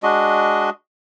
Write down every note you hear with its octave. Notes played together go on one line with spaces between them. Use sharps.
G#3 D4 F#4 D#5